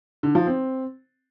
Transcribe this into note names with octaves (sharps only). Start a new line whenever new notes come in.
D3
F3
C4